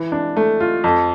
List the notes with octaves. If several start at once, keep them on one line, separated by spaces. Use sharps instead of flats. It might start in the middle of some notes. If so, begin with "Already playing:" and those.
Already playing: E3
D4
A3
F4
F2